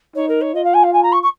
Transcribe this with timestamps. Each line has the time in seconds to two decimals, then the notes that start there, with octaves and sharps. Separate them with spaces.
0.15 D#4 C#5
0.29 A#4
0.41 C#5
0.54 F4 D#5
0.64 F5
0.74 G#5
0.84 F5
0.93 G#5
1.03 A#5
1.12 C#6
1.23 C#6